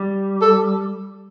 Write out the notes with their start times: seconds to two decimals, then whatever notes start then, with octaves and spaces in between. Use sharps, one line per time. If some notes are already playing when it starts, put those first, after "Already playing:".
Already playing: G3
0.42 A4